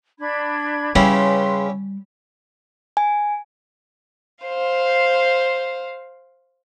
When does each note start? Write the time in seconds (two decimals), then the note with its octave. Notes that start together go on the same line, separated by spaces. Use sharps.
0.20 D4 B5 G#6
0.95 C#3 G3 C#4 E4 G4 B4 C6
2.97 G#5
4.45 C5 F5